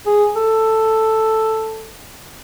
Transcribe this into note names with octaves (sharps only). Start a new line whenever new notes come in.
G#4
A4